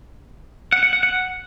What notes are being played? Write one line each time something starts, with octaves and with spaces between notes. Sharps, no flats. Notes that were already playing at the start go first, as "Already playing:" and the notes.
F#5
F#5
F#5
F#5